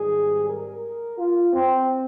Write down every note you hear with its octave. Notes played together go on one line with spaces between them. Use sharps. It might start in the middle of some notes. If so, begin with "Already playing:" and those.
Already playing: G#1 G#2 G3 G#4
A#4
F4
C4